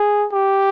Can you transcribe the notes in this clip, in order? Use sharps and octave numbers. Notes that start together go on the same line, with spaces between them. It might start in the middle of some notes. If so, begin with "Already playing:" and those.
Already playing: G#4
G4